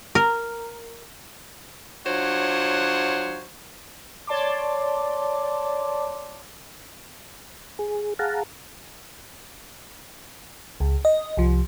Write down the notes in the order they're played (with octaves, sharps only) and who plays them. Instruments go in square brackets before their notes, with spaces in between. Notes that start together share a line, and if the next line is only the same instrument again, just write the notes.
[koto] A#4
[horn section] F#3 D4 F4 C5 C#5 F#5
[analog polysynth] C#5 D5 A5 C6 D6
[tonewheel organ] G#4
G#4 F5 F#5 A5 A#5
[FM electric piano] C#2
D#5
C2 F3